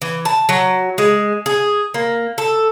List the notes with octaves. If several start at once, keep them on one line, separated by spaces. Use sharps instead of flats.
E3
A5
F#3
G#3
G#4
A#3
A4